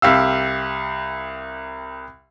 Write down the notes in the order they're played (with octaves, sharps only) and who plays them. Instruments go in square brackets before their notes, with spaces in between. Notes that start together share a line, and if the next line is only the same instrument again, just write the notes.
[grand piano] C2 G4 F5 E6